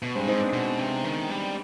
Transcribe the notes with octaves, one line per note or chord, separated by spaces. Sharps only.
B2
G2 G#3 C4
G#2 C4 D#4
B3 D4
B2
C3
D#3
G3